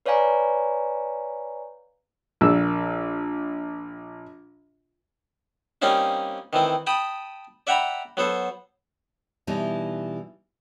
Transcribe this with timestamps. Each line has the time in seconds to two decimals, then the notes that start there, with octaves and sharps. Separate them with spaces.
0.06 B4 C#5 D5 F5 G#5 A#5
2.41 A#1 E6
5.82 G3 A#3 C4 C#4 D#4 F4
6.53 D#3 E3 C4
6.87 G5 A5 B5 D#6
7.67 D5 E5 F#5 G5 A#5 B5
8.17 F#3 B3 A4 C5
9.47 B2 E3 G3 D#4 E4